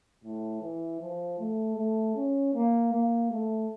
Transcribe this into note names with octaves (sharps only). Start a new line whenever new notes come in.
A2
E3
F3
A3
A3
C#4
A#3
A#3
A3